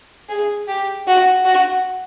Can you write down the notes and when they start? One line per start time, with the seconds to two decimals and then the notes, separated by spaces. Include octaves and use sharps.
0.29 G#4
0.68 G4
1.07 F#4
1.45 F#4